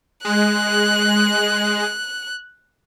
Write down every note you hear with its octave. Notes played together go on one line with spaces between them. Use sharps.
G#3 F#6